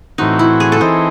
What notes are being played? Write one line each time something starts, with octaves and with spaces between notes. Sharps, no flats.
A2 E3 C4 D#4 F#4
E4
G#4
A4
E3 C4 D#4 C5